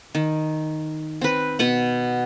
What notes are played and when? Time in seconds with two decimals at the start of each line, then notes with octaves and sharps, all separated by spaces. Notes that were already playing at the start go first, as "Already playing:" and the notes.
0.15 D#3
1.21 C4 B4
1.59 B2 B4 F#5